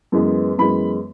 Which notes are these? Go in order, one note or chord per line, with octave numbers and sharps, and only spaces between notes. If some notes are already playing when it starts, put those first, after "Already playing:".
F#2 E3 G#3 B3
F#2 E3 G#3 B3 B5